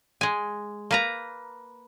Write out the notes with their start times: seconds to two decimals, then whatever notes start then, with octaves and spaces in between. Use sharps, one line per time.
0.21 G#3 G#5
0.91 A#3 B4 A#5